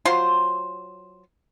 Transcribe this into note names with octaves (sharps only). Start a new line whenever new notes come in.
F#3 F4 C5 C6